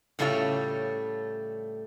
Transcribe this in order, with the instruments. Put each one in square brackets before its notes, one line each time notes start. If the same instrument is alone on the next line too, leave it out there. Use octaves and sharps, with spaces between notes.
[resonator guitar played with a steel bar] A2 C#3 G3 A3 F4 C#5